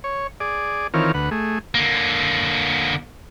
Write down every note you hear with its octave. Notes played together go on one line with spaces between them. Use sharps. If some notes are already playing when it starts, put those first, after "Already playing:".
C#5
G#4 D5
D#3 E3 C4 F4 A#4 C#5
D2 B4 F#5
A3 G#4
D3 A#3